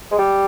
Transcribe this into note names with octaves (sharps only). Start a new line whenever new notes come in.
G#3
G3